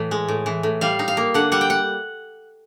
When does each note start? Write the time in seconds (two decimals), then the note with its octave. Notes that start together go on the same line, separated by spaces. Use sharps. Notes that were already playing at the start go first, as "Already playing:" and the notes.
Already playing: A2 E3
0.11 G#3
0.28 A2
0.46 E3
0.63 A2
0.81 G3 F5
0.99 D#4
1.08 F5
1.17 A#3
1.34 D3 F#5
1.52 G3 F#5
1.61 G5
1.70 F#5